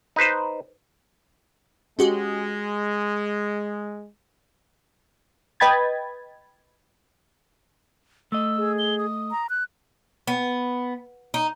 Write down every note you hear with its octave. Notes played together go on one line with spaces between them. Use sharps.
D#4 B4 C5
G#3 C#4 F#4 G4
B4 D#5 G5 B5 G#6 A6
A3 D#5 E6
G#4
G7
D#6
A#5
F#6
B3
D#4